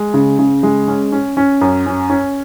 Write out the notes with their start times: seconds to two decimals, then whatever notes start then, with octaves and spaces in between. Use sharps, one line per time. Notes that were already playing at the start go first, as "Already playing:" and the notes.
Already playing: G#3
0.14 C#3
0.39 C#3
0.63 G#3
0.88 C#4
1.12 C#4
1.37 C#4
1.61 F#2
1.86 C#4
2.10 C#4